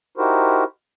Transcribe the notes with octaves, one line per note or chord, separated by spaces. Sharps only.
D#4 E4 F#4 G4 A#4 C5